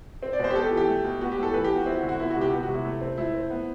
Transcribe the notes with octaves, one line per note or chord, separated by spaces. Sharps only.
C4
D5
B2 C5
G4
B3 A4
G4
E3
G4
A3
B2
B3 F#4
G4
A2
A4
E3 B4
G4
B3
F#4
C4 E4
F#4
D3
F#4
B3 E4
F#4
C3
G4
B3 F#4
F#4
C3
E4
A3
C4
A3 E4
C4
B3